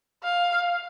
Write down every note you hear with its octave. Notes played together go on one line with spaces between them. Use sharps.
F5